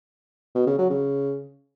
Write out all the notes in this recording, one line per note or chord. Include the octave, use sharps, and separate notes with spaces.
B2
C#3
F#3
C#3